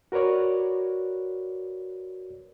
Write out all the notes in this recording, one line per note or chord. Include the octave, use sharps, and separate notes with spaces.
F#4 A#4 B4 C#5 D5